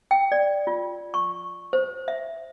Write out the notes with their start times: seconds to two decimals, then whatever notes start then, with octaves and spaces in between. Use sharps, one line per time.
0.11 G5
0.32 D5
0.67 F4
1.14 C#6
1.73 C5
2.08 E5